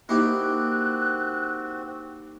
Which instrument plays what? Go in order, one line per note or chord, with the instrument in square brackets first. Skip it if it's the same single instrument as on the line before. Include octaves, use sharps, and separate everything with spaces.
[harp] A#3 D#4 [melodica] C4 F#4 [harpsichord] E4 G4 [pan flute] F#6